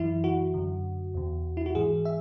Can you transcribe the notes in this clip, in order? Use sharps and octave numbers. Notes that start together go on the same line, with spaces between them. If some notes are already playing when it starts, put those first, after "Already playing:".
Already playing: F#2 E3 E4
F#4
F#2 D3
E2 B2
E4
F#4
G#2 E3 G#4
E5